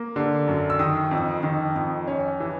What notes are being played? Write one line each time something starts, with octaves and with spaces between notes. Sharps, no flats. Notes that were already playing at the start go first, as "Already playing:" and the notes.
Already playing: A#3
D3
F#2
E6
D#3 D#6
F2
D#3
F2
C#4
E3